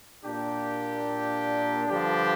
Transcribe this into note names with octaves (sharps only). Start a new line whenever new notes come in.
A#2 A#3 D4 G4
G2 D3 F3 D4 G4